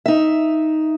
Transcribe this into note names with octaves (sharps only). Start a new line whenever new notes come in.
D#4 E5